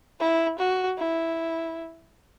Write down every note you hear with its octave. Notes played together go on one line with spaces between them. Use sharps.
E4
F#4
E4